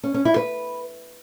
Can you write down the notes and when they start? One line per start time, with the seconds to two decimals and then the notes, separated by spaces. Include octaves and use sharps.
0.03 C#4
0.14 C#4
0.25 E4
0.36 B4